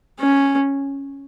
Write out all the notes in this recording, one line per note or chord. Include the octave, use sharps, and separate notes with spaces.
C#4